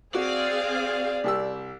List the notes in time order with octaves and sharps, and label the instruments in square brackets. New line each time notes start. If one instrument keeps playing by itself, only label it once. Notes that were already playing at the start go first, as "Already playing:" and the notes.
[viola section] C4 G#4 F5 [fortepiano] F#4 [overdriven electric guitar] D5
[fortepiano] C2 G4 E6